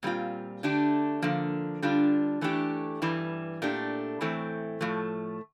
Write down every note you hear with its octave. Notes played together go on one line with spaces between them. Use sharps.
A#2 G3 C4 F4
D3 A3 D4 G4
D3 F3 A#3
D3 G3 D4 F4
E3 A3 D4 G4
G2 E3 G3
A#2 A3 D4 G4
A2 E3 A3 C4
A2 F3 A3